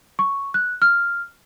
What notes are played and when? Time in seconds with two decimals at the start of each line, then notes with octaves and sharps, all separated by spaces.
0.19 C#6
0.54 F#6
0.82 F6